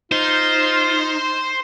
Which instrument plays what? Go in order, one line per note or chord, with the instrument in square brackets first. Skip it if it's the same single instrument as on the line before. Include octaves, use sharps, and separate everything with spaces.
[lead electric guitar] D#4 [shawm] F4 [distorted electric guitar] C5